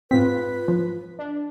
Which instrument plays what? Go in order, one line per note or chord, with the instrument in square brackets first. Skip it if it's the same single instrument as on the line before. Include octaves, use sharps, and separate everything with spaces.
[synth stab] G#2 F4 B6 [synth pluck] C4 [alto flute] B4
[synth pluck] F3
[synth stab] D4